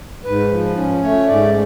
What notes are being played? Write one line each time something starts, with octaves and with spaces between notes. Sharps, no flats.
G#2 B4
F3
C#4
A3 C#5
G#2 D5